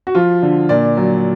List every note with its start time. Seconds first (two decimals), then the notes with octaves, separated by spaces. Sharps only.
0.07 F#4
0.15 F3 F4
0.43 D3
0.69 A#2 D5
0.97 F#3